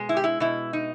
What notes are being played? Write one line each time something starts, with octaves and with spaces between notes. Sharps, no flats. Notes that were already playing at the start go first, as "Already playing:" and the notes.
Already playing: B2 G#3
E4
G4
E4
B2 E4
D#4